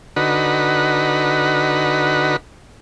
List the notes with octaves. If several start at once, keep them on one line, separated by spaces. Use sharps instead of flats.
D3 D#4 F#4 B4